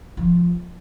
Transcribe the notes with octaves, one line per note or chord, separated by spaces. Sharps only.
F3